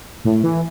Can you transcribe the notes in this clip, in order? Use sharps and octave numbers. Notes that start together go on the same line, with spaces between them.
A2
E3